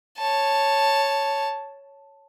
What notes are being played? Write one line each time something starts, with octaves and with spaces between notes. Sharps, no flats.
C#5 A5